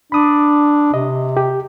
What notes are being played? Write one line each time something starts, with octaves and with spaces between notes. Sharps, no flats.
D4 B5 D#6
C3 D#5
G4